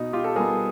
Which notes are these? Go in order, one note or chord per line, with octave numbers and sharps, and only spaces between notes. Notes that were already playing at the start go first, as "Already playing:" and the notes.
Already playing: B2 D#4
F4 G4
A4
G3 B3 G#4 A#4